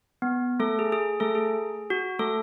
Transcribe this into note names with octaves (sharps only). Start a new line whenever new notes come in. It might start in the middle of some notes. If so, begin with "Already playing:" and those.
B3
A3 A4
G#4
G#4
A3 A4
G#4
F#4
A3 A4